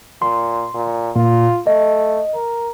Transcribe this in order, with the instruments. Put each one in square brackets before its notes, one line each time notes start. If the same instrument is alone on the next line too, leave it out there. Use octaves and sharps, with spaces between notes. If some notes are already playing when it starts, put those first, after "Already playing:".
[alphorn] A#2 [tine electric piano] C6
[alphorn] A#2
[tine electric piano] A#2 [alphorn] F4
[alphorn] A3 [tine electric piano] D#5
[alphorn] A#4